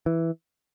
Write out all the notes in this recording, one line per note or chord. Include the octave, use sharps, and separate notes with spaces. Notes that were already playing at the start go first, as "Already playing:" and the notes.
E3